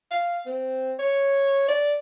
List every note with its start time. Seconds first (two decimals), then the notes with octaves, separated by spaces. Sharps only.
0.11 F5
0.46 C4
0.99 C#5
1.68 D5